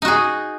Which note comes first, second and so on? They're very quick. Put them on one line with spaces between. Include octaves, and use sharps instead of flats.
D#4 F#4 G#4